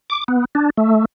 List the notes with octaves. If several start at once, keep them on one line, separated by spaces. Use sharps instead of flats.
D6
B3
D4
A3